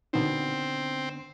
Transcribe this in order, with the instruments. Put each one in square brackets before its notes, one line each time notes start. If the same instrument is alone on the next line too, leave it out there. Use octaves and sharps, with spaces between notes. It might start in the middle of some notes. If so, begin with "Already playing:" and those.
[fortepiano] B2 D#3 [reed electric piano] D3 B3 D4 [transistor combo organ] C4